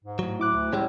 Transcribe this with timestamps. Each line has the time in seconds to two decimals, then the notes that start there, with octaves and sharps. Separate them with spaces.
0.05 G#2
0.19 A2 F#3
0.39 E4 D6 F#6
0.53 D2
0.73 A2 G3 G#3 C#4